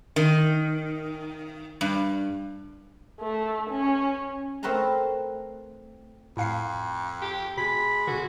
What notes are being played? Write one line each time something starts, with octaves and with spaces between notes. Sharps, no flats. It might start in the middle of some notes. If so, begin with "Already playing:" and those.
D#3
G2
A3
C#4
A3 C4 A#4 B4 A5 A#5
F2 A2 F5 C7
G4
B2 G#3 B5
B2 D3 F#4